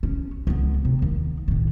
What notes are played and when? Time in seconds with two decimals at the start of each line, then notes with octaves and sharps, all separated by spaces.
0.03 C#4
0.47 C#2 B3
0.85 C3
1.02 D#2
1.48 A2 D#3